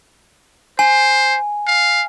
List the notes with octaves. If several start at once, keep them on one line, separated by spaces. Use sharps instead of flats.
C5 G#5
F5